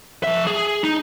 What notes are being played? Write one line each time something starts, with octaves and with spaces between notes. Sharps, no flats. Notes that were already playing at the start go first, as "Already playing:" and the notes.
F3 E5
G#4
D#4